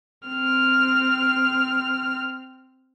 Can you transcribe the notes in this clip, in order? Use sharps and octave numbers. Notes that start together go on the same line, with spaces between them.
C4 F6